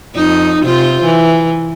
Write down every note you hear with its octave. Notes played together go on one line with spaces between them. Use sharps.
F2 D#4
C3 F4 C5
E3